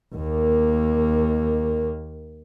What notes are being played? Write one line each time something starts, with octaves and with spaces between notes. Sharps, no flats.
D#2 A#3